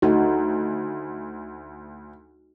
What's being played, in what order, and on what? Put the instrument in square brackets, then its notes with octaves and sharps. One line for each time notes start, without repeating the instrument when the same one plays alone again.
[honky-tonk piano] D2 [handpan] D#4 F#4